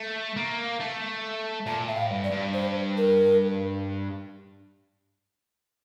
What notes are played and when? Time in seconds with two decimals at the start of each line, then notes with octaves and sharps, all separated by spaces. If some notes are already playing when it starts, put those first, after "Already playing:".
Already playing: A3
0.36 A#3
0.80 A3
1.66 A#2 A5
1.88 A2 E5
1.95 F5
2.10 G2
2.24 D5
2.32 G2
2.54 C5
2.97 A#4